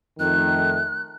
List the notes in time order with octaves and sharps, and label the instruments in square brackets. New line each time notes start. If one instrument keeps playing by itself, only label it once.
[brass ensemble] F2 D#3 A3 [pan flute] F#6